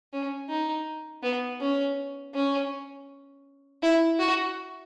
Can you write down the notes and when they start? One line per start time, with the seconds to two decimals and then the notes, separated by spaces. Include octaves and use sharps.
0.13 C#4
0.49 D#4
1.23 B3
1.60 C#4
2.34 C#4
3.83 E4
4.19 F#4